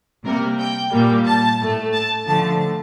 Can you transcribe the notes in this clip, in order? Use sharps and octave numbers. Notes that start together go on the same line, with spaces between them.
C3 G3 A#3 A#4
G5
A#2 G3 A#3
A5
A2 A3
A5
D3 F3 A3 A5